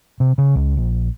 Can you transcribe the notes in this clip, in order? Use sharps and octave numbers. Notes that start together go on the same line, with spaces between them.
C3
C#3
C#2
A#1